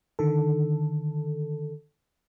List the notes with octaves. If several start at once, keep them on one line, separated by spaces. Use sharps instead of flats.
D3 D#3 A4